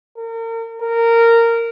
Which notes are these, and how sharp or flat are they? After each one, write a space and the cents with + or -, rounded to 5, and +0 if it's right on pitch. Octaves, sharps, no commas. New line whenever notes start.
A#4 -35
A#4 -15